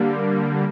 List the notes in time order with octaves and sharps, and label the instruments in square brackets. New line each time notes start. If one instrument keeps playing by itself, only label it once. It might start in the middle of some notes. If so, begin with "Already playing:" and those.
Already playing: [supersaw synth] D3 G3 A#3